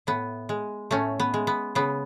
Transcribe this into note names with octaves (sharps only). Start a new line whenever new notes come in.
A2 B3
G#3
A2 A3 C#4
B3
G#3
B3
C#3 B3